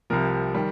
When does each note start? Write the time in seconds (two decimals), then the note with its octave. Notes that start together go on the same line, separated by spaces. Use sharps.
0.10 C2 C3 F3 A#4
0.55 D#3 G3